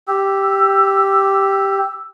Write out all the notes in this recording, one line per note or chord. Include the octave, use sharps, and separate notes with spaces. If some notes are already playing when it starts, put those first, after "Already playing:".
G4 E6